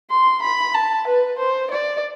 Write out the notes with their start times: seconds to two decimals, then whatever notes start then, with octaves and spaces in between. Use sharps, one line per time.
0.10 C6
0.42 B5
0.74 A5
1.07 B4
1.38 C5
1.71 D5